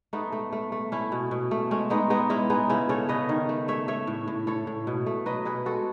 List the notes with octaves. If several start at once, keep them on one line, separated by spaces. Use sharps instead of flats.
A3 B3 D#4
A3
A3
A3
A3 C#4 E4
B2
B2
A3
G#3 A3 C#4
G#3 B3 D#4
G#3 B3 D#4
G#3 C#4 E4
G#3 B3 D#4
C#3 C#4 E4
C#3 A4 C#5
C#3 B4 D#5
D#3
A3
A3 C#5 E5
A3 C#5 E5
A2
A2
A2 A4 C#5
A2
B2
A3
F#3 B4 D#5
B2 G#4 B4
G#3 F#4 A4